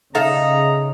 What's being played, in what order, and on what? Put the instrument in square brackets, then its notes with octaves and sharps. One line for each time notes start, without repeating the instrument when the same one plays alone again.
[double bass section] C#3 [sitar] D#4 [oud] A4 E5 F5 [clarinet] A#5